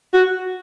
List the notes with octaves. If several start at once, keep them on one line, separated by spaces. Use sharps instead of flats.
F#4